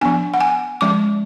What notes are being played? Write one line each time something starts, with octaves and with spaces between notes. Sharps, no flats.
F3 B3 D4 G#5
F#5
G#5
F3 G#3 C#4 D6